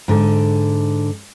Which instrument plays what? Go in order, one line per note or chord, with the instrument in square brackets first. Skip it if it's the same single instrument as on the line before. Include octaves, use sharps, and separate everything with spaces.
[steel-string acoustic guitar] G#2 D3